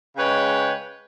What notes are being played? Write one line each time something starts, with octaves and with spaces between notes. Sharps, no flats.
C#3 G#3 B4 C#5 G5